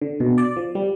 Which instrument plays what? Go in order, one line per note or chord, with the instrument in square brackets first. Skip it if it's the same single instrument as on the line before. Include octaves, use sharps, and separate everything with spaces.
[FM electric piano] D3
B2
D5
F3
G3